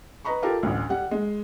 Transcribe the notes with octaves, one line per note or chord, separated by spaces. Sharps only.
B4 D#5 A#5 B5 C#6
F4 G4 A4 A#4
A1 D2
G3 F#5
G#3